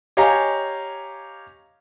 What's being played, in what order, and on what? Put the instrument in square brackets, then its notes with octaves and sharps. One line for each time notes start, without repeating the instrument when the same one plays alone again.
[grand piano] G4 C#5 D#5 F5 G#5 A#5